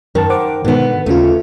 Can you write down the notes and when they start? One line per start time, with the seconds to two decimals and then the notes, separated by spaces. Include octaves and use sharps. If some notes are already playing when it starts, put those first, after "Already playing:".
0.15 F#2 D#3 A5
0.30 C5 F#5 D6
0.65 G#2 B2 D3 D#3 B3
1.06 D#2 C#3 A3 C#4 F4